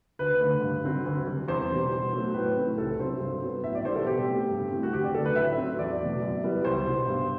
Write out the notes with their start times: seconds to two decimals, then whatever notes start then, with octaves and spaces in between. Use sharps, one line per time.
0.19 D2 B4
0.40 D3 A3
0.62 G2
0.84 D3 F#3 C4
1.05 D2
1.26 C3 G3
1.48 E2 C5
1.70 B2 G3 C4
1.91 B2
2.13 F#3 A3
2.34 A2 B4
2.56 E3 A3 C4
2.77 C2 A4
2.99 C3 F#3 C4 C5
3.20 G2
3.42 F#3 B3
3.63 A2 E5
3.75 D5
3.85 E3 C5
3.88 G3 B3
3.96 A4
4.06 B2 G4
4.29 A3 C4
4.50 G2
4.71 E3 A3 C4
4.83 F#4
4.92 D2 G4
5.04 D5
5.15 D3 F#3 A3 A4
5.25 B4
5.35 A2 E5
5.57 F#3 C4
5.79 E2 D5
6.01 B2 A3
6.22 F#2
6.44 E3 G3 B3
6.65 C2 C5
6.86 B2 G3
7.08 G2